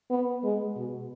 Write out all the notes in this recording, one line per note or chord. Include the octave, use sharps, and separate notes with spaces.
B3
G#3
B2